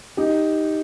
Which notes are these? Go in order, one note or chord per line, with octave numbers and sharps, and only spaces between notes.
D#4 G4